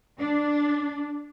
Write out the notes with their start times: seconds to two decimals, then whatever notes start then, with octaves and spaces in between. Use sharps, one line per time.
0.18 D4